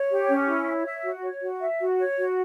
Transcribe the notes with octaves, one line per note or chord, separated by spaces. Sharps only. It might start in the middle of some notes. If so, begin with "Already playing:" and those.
Already playing: C#5
G4
C#4
E4
C#5
E5
F#4
C#5
F#4
E5
F#4
C#5
F#4